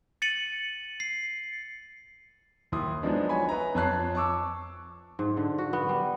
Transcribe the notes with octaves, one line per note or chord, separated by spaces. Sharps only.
A6 C#7 D#7 F#7
C7
D#2 E4 C6 D#6
F3 F#3 G#3 B3 D4 D#4
C#5 G#5 B5
B4 E5 A#5
F2 C#5 A5 F#6 C7
A5 C#6 D6 E6
G#2
D3
F#4
B3
G3